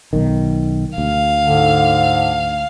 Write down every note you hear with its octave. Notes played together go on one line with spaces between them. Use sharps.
B1 D#3
D2 F5
G#2 D3